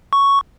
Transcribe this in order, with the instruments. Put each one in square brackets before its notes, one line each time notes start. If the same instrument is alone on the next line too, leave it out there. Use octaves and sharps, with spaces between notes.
[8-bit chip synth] C#6